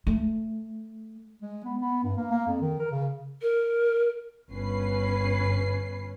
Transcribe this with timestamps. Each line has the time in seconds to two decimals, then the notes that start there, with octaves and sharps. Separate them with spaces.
0.07 A3
1.42 G#3
1.64 B3
1.81 B3
2.04 G2
2.16 A#3
2.31 A#3
2.47 F2
2.61 D#3
2.80 A#4
2.91 C#3
3.42 A#4
4.51 G1 C#4 B4 C7